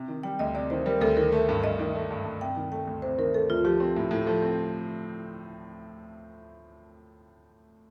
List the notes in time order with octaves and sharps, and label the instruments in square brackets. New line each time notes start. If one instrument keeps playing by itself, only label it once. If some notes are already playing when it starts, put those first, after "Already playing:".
Already playing: [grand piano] C3
D#3
[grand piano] G3 [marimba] G5
[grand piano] D2 [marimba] D#5
[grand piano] C3 [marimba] D5
[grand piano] D#3 [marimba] C5
[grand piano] G3 [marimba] A#4
[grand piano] D2 [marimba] A4
[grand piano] D#3 [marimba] A#4
[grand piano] A3
G2
[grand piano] G2 [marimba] D#5
[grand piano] D#3
A3
G2
G2
[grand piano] C3 [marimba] G5
[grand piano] D#3
[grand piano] A3 [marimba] G5
[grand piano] D2
[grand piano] C3 [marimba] C5
[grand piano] D#3 [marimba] A#4
[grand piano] A3 [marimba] A4
[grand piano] D2 [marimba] F4
[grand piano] F3 [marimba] G4
[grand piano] C4
A2
A2
[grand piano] F3 [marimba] A4
[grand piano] C4